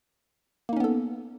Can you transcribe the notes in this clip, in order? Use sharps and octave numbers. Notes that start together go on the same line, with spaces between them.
A#3 B3 C#4 D#4 A4